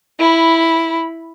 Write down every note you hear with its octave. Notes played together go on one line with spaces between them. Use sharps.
E4 B5